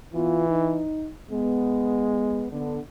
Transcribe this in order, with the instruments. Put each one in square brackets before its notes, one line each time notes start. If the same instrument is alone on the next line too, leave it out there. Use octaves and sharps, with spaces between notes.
[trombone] E3 [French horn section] B3 F4
[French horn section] D#4
[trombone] G#3 [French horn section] B3
[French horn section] D3 B3